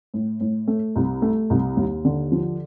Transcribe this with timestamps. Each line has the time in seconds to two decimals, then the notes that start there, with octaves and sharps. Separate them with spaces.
0.14 A2
0.41 A2
0.68 A3
0.96 C2
1.22 A3
1.50 C2
1.77 D#2
2.05 D3
2.32 F3